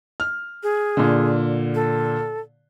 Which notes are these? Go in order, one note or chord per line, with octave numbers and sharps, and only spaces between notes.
F6
G#4
A#2 D3
A4